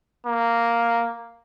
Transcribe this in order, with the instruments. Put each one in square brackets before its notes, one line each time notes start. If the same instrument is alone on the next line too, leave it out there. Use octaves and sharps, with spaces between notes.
[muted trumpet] A#3